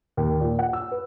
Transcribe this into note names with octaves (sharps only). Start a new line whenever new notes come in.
D#2
A#2
F#5
E6
B4